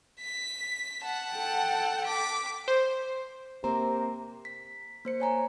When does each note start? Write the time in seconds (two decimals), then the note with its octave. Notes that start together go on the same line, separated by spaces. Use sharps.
0.21 B6
1.04 F#5 A5
1.35 A4 G5
2.06 D6 B6
2.68 C5
3.64 C3 A#3 C4 C5 A#5
4.45 B6
5.05 A#3 C5 C#7
5.20 C#5 G#5 A#5